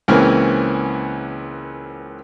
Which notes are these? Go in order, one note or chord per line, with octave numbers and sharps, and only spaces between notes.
C#2 E3 A#3 C4 C#4 F6